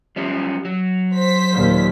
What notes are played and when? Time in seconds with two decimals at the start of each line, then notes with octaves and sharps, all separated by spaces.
0.16 F3 G3 C#4
0.65 F#3
1.14 C5 B6
1.52 D#2 A#2